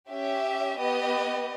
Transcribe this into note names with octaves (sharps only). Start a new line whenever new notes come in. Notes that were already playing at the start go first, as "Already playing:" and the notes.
C#4 G4 E5
B3 G4 D#5